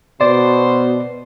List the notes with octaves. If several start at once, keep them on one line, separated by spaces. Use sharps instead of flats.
B2 C5 D5